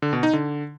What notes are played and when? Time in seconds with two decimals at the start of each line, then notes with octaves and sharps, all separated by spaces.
0.02 D3
0.13 B2
0.23 D#4
0.33 D3